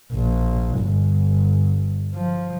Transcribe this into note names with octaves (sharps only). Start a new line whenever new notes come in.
A#1
G1
F3